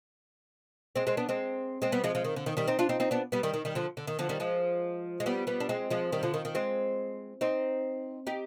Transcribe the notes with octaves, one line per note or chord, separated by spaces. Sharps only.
G#3 C4
G#3 C4
B3 D4
G#3 C4
G#3 C4
G3 B3
F3 G#3
F3 G#3
D#3
D3
D#3
D#3 G3
C4 D#4
D4 F4
C4 D#4
C4 D#4
B3 D4
G3 B3
D#3 G3
D#3
D#3 G3
D3 F3
D3
D#3
D3 F3
D#3 G3
F3 G#3
G#3
G3 B3
G3 B3
D4
G#3 C4
F3 G#3
D#3 G3
D3 F3
D#3
D#3
G#3 C4
C4 D#4
D#4 G4